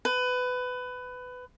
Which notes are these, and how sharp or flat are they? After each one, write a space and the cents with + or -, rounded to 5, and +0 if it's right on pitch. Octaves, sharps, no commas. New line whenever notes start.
B4 +20